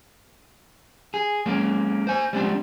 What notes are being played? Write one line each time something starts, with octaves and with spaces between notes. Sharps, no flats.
G#4
G#3 A#3 C#4
C5 G#5
G3 G#3 C4 D4